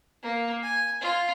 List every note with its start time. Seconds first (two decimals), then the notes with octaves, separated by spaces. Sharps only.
0.22 A#3
0.63 G#5
1.01 F4